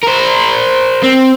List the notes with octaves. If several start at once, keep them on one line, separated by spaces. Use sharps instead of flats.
A#4 C5
C4